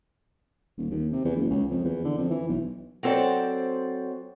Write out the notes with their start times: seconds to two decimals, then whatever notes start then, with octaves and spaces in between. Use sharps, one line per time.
0.77 D#1
0.91 D#2
1.12 C3
1.24 E2
1.36 F#1
1.50 C#2
1.71 F2
1.84 E2
2.05 D3
2.18 F2
2.30 E3
2.48 B1
3.03 F#3 C4 A4 C5 D5